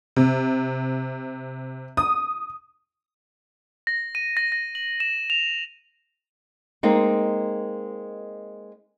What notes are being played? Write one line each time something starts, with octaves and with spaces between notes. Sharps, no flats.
C3
D#6
A#6
D#7
A#6
A#6
F#7
E7
F7
G#3 A#3 C4 D#4